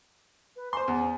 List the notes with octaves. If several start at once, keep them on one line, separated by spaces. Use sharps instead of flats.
B4
C5 G#5 C6
E2